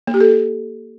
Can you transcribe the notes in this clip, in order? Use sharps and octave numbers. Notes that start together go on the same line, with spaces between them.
A#3
G4
A4